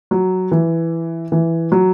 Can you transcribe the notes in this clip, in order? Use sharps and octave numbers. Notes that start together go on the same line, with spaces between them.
F#3
E3
E3
F#3